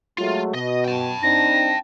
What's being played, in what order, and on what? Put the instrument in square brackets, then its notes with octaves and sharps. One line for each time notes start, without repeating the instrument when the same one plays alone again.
[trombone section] F#3 G#3 A3 [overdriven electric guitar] F4
[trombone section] B2 [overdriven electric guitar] D#5
[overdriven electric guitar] G5 A5
[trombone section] C4 D4 D#4 [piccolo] A#6